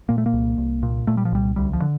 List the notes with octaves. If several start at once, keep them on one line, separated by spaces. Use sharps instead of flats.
A#2 A#3
A3
A#3
C2
C2
A#2
A#2 A3
G3
F3
C2 G3
D2 G3
F3
D3